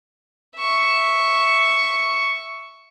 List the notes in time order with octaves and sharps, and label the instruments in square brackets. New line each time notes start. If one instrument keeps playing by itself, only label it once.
[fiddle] E5 C#6